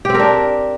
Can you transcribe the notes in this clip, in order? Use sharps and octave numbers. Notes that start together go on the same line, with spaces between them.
C4 D4 G4 A#4